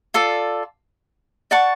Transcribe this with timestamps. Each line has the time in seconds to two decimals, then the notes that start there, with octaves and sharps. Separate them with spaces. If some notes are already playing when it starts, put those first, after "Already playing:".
0.14 F4 A4 D5
1.51 D5 F#5 A5 C#6